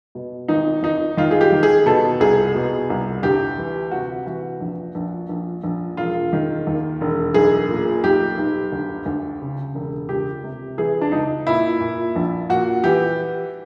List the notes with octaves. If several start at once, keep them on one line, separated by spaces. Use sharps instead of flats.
B2
G#1 D#4
G#1 D#4
D#3 F4
G#4
G4
D#3
G#4
B2 A4
C2 G#4
B2
C2
D2 G4
E3
C3 F#4
E3 F#4
A#1
A#1
A#1
A#1
E1 F4
D#3
D#2
E1
B1 G#4
A#2
B1 G4
B1
D2
D2
C#3
E1
C#2 G4
C3
E3 G#4
D4
C#2 D#4
A#2 E4
A#2
A#1
A#2 F#4
E3 G4